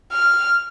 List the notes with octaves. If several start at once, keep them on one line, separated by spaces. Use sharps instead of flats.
F6